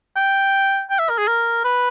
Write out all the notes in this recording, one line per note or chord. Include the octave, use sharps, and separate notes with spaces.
G5
G5
E5
A#4
G#4
A#4
B4